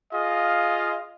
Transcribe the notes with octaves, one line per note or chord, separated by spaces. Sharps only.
F4 G#4 D#5 F5